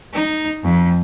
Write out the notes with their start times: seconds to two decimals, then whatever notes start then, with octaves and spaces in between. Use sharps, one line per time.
0.14 D#4
0.63 F2